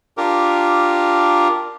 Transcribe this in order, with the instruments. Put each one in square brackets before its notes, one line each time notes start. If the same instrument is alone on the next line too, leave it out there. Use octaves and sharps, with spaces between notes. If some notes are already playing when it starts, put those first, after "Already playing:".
[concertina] D4 F4 G4 A#4